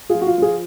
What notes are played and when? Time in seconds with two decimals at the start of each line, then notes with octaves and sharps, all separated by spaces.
0.09 F4 G#4
0.15 F3
0.21 F#4
0.27 F4
0.38 F3 F4 G#4